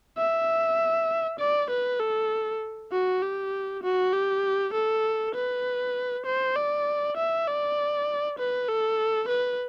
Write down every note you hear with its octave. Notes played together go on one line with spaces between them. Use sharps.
E5
D5
B4
A4
F#4
G4
F#4
G4
A4
B4
C5
D5
E5
D5
B4
A4
B4